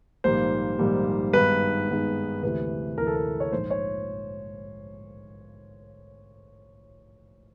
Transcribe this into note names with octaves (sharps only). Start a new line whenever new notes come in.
A#1 G#2 D#3 G3 A#3 C5
A#1 G#2 D#3 G3 A#3
G2 D#3 G#3 B3 D#4 B4
G2 D#3 G#3 B3 D#4
D2 C3 E3 A3 B4
D2 C3 E3 A3 A#4
A4
A#4
C#5
A#1 G#2 F3 C5
C#5